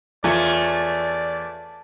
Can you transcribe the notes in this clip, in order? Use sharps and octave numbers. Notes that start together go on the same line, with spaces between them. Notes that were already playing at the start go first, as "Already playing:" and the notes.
E2 A3 F4 C#5 D5